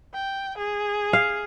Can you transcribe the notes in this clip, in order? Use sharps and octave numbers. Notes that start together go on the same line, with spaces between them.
G5
G#4
F5